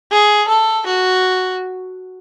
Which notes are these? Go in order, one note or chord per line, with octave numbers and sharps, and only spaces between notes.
G#4
A4
F#4